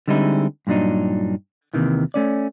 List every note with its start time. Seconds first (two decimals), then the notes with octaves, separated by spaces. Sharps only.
0.08 D3 G3 G#3 C4 D#4 E4
0.67 G2 A#2 F#3 D4 D#4
1.74 D#2 C3 D#3 E3
2.14 A3 C#4 D5